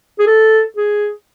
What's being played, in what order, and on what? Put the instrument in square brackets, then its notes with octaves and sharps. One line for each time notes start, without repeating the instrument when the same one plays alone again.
[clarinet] G#4
A4
G#4